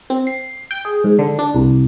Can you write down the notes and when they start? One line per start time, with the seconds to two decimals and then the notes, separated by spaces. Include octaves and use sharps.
0.10 C4
0.27 C7
0.71 G5
0.85 G#4
1.04 G#2
1.19 D3
1.39 D4
1.54 C2